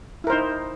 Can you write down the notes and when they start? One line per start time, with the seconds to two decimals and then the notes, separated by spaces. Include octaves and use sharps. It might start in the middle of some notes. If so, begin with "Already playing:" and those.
0.24 E4
0.27 A#4
0.30 C5
0.33 D#4